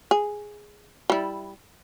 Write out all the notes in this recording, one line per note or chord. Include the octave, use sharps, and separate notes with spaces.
G#4
G3 E4